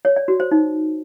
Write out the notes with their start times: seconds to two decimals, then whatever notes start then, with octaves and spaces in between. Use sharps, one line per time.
0.05 C#5
0.16 D5
0.28 F#4
0.40 C5
0.51 D#4